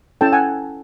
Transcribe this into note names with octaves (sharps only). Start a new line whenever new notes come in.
C#4 E4 A4 G5 A5
F#5 G#5